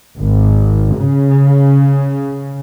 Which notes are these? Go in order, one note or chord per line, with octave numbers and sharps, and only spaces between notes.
G#1
C#3